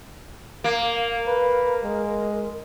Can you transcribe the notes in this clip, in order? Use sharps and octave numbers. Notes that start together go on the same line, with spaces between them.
A#3 A#4
B4
G#3